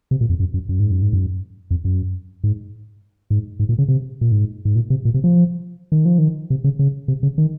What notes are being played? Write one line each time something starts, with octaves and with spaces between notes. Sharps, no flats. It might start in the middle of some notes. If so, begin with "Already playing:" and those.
C3
A#2
F2
F#2
F#2
F#2
G#2
F#2
G#2
F#2
F2
F#2
G#2
G#2
G#2
A#2
C#3
C3
A#2
G#2
G#2
A#2
C3
A#2
C3
F3
D#3
F3
D#3
C3
C#3
C#3
C3
C#3
D#3